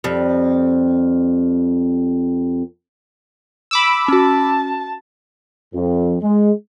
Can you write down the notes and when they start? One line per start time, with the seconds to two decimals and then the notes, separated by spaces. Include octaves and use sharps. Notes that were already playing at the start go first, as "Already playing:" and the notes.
0.04 F2 G3
3.71 B5 D6 E6
4.08 C#4 F#4 A5
5.74 F2
6.22 G#3